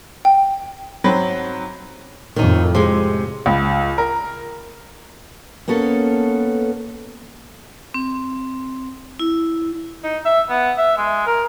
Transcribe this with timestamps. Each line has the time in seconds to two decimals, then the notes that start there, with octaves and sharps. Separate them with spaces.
0.25 G5
1.04 G#2 F#3 C4 B5
2.36 F2 A2 D#3 D#4
2.75 C3 G#3
3.46 C#2
3.98 A#4
5.68 A#3 B3 C#4 A4
7.94 C4
9.19 E4
10.04 D#4
10.25 E5
10.49 B3
10.78 E5
10.98 G#3
11.27 A#4